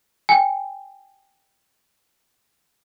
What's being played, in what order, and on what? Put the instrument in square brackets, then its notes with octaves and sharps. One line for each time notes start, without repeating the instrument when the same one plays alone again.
[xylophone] G5 G#5